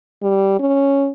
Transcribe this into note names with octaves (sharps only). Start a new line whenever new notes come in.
G3
C#4